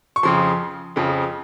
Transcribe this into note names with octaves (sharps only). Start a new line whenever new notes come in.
C#6
F2 C#3 F3 C6
F2 C#3 F3